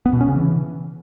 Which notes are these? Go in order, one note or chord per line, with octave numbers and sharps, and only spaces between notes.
B3
B2
C#4
C#3
E3